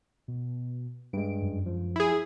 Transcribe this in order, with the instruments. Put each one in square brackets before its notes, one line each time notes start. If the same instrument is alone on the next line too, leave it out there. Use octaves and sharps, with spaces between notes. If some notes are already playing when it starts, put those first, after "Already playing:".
[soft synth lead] B2
[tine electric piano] G2 G#3 [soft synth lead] D7
[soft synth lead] F#2
[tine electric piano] F3
[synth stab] E4 G#4